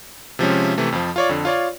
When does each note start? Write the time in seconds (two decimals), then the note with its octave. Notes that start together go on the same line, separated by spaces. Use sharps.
0.39 C3 F3 G#3 C#4
0.78 C3 E3 A3
0.92 F2 F3
1.16 F4 C#5 D5
1.29 F2 D3
1.45 F4 C#5 D5